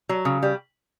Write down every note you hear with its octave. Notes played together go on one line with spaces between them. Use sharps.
F#3
C#3
G3